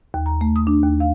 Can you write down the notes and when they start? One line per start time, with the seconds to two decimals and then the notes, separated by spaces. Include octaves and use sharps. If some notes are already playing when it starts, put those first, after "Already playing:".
0.14 D#2
0.26 A#5
0.41 A3
0.56 D#6
0.67 D4
0.84 D#2
1.00 F5